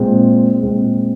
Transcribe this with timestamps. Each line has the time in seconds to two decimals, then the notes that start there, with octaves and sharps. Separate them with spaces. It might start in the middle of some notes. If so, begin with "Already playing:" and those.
Already playing: A#2 G#3 C4
0.63 A#2 G#3 C4